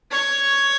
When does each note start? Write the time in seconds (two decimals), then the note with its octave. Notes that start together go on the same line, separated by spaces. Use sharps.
0.11 C#5